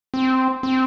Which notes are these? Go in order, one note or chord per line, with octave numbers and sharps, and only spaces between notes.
C4
C4